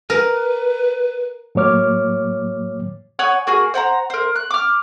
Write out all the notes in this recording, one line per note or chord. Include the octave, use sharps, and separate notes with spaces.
A#4 B4
A2 F#3 A#3 C#5 D6 F6
C#5 F#5 G#5 D#6
A#3 F#4 G#4
C5 F#5 G5 A#5
A#4 C5
F#6
D6 F6